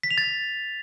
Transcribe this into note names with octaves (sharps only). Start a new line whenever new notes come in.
B6
F7
A6